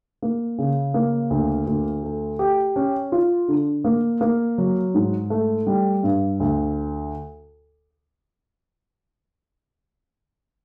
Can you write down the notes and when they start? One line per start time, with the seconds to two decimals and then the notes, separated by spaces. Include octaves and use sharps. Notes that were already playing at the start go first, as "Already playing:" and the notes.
0.22 A#3
0.58 C#3
0.94 A#3
1.30 D2
1.67 D2
2.03 A3
2.39 G4
2.76 C#4
3.12 F4
3.48 D3
3.85 A#3
4.21 A#3
4.58 F#3
4.94 G#2
5.30 A3
5.67 G3
6.03 G2
6.40 D2